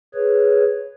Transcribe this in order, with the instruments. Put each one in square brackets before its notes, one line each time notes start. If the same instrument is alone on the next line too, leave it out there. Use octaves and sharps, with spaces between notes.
[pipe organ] G#4 B4 C#5